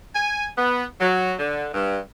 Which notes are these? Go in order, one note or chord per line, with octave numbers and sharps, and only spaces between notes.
G#5
B3
F#3
D3
G2